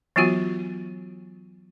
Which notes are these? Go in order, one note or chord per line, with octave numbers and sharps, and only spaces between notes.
E3 F#3 B3 F4 F#4